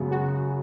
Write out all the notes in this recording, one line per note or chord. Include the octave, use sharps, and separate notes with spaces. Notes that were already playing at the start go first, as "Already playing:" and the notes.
Already playing: F#2 C#3 G#3 B3 F#4 G#4
F#4